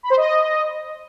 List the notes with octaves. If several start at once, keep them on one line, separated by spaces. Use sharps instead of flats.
B5
C5
D#5